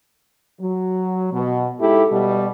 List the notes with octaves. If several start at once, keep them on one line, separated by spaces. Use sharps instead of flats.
F#3
B2
G#2 E4 G4 A4
B2 G3